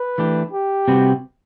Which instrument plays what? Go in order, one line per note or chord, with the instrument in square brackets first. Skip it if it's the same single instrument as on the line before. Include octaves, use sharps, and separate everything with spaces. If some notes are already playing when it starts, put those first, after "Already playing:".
Already playing: [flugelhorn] B4
[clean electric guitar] E3 A3 D4 G4
[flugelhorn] G4
[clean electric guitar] C3 G3 C4 F#4 B4